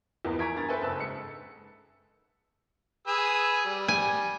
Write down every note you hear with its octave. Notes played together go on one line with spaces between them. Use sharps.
E2 E3 F3 A#3 B3 D#4
G#5 A#5 C#6 G#6 B6 D7
G2 A#4 A#5 A6
A4 B4 C5 E5 G5 G#5
F#1 B4 A5 E6
G#2 C#7
G#4 B4 E6
G3
G#5